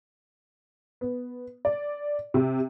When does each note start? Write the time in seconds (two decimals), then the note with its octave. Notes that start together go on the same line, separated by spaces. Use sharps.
1.01 B3
1.65 D5
2.34 C3